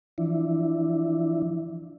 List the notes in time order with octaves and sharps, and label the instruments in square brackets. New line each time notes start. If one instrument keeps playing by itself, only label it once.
[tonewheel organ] E3 F3 D4 E4